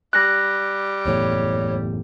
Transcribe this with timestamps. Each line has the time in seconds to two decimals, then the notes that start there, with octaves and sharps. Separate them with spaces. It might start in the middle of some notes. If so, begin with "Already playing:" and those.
0.13 G3 F#6 A#6
1.05 F#1 E2 A2 C#5